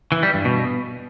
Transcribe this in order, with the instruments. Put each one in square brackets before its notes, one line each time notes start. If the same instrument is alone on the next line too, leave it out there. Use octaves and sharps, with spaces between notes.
[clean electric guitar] E3
G3
G2
B2